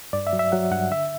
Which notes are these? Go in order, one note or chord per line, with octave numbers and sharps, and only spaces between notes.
G2 D5
E5
F#3
E5
F#3 F#5
G2 F#5
D3 E5